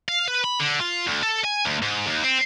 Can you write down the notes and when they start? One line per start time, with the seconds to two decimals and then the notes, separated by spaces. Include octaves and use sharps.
0.09 F5
0.28 B4
0.44 B5
0.60 D3
0.81 F4
1.07 D2
1.23 A4
1.44 G#5
1.66 D2
1.82 G#2
2.07 D#2
2.24 C4